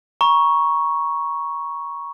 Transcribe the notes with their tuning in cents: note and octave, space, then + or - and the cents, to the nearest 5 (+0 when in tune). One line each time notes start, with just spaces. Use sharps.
A#5 +35 C#6 +0